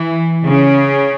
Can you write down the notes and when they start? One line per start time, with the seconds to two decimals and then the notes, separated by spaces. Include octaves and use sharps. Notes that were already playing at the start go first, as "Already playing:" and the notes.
Already playing: E3
0.46 C#3